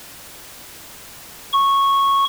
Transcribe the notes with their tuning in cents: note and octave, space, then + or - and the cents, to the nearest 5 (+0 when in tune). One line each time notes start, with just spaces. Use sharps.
C#6 -10